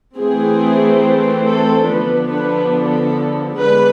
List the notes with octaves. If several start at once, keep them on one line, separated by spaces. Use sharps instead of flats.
E3 A3 C4 G#4
A4
D3 F3 B3 D4 B4
B4
A4
D3 G#3 B3 B4